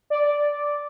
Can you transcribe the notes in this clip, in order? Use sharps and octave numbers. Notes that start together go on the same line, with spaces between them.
D5